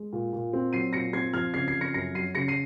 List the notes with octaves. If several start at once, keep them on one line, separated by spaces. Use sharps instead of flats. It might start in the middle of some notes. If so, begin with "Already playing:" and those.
Already playing: G#3
A#2
A#2
C4
F#3 C7 D#7
A#2 A#6 C#7
C4 G#6 C7
F3 F6 G#6
C#3 G#6 C7
G#6 C7
F2
A#6 C#7
F#2 A#6 C#7
F#3 C7 D#7
C#3 A#6 C#7
C7 D#7